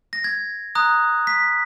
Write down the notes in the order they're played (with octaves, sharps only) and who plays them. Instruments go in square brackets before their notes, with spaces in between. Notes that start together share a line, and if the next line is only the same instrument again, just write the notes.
[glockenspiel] A#6
G#6
A#5 D#6 F#6
B6